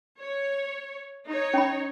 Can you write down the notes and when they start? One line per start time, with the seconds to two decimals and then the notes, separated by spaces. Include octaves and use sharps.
0.19 C#5
1.25 D#4 C#5
1.54 C#4 B5